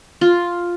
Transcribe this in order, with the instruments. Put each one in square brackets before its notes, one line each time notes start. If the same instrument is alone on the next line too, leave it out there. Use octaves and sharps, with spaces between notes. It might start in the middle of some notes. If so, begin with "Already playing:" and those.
[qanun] F4